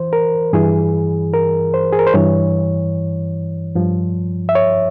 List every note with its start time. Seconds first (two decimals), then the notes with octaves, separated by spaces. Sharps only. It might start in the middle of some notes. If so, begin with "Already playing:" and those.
Already playing: E3 C5
0.13 A#4
0.53 G2 E3 G#4
1.34 A#4
1.74 C5
1.93 G#4
1.99 A#4
2.07 C5
2.14 G2 E3 C#5
3.75 G2 F3
4.49 E5
4.55 C#5